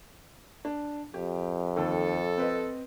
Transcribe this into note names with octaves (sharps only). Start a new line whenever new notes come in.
D4
F2 G4
D#2 A4
C4 B4 D#5